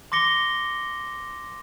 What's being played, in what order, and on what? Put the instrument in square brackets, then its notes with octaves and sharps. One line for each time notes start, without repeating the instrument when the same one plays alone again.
[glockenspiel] C6 D6 A#6 C#7 G7